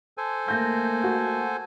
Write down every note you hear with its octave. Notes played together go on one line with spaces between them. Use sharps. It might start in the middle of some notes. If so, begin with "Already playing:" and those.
A4 C5 G#5
A3 A#3 G6 A#6
F#4